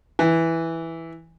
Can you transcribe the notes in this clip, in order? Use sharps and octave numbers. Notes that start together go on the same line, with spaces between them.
E3